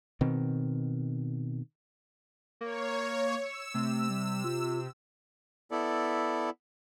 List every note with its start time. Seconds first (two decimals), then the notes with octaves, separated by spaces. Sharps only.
0.21 B2 D#3 C4
2.61 A#3 C#5
3.41 E6 C#7
3.74 C3 A3
4.10 G3
4.44 F4
5.71 B3 E4 A4 D5